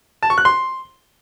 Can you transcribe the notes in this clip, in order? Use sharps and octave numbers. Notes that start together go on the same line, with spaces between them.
A5
C#6
F#6
C6